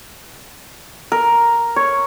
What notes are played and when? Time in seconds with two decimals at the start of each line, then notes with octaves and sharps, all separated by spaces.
1.12 A#4
1.76 C#5